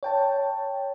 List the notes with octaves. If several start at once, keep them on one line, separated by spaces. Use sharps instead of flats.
C#5 G5 A5